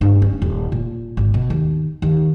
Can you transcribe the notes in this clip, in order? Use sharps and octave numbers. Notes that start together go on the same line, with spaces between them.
G2
C#4
D#1
A#2
G#1
B2
D#2
D#2